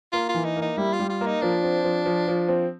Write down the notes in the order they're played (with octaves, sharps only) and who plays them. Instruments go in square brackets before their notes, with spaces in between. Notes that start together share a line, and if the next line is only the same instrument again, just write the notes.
[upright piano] A#3 [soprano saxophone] F4
[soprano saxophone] F4
[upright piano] E3
[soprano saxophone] D#4
[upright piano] A#3
[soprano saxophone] D#4
[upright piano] G3 [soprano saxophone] E4
[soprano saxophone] F4
[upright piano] G3
[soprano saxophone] F4
[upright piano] A#3
[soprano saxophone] D#4
[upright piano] F3 [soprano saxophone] D4
[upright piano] C4
F3
F3
F3
C4